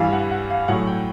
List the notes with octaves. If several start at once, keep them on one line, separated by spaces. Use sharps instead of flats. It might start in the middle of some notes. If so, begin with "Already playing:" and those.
Already playing: G2 E3 G3 F5
F#5
F#5
F5
A2 F#3 F#5
G5